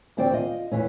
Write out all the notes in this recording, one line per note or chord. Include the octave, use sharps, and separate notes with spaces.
D2 E3 C4 C5 D5 G5
F4 D#5
E2 E3 A3 C#4